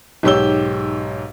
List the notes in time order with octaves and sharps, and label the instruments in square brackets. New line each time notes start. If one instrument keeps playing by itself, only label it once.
[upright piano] B1 G#2 G4 C#5 E6 G7